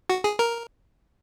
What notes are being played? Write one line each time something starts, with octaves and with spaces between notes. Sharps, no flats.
F#4
G#4
A#4